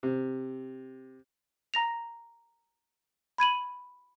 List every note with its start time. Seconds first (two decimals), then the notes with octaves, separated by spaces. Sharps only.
0.03 C3
1.74 A#5 A#6 F7
3.38 B5 G#6 D#7 F#7